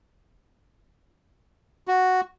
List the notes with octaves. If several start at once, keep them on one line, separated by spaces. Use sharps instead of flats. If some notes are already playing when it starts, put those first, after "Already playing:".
F#4